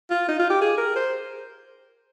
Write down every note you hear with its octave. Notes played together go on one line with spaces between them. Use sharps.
F4
D#4
F4
G4
G#4
A#4
C5